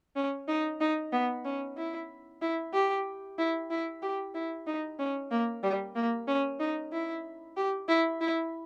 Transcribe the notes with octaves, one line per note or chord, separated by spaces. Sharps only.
C#4
D#4
D#4
B3
C#4
E4
E4
G4
E4
E4
G4
E4
D#4
C#4
A#3
G3
A#3
C#4
D#4
E4
G4
E4
E4